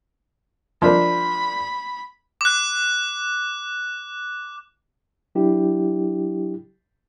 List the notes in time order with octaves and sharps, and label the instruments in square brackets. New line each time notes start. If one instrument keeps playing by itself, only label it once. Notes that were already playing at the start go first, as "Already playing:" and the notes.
[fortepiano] F3 D4 A#4 [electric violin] B5
[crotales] D6 F#6
[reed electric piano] F#3 D4 E4 G4